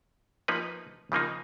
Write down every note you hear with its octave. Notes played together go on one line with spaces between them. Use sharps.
F3 A#3 D#4 B4
C#3 F3 A#3 D#4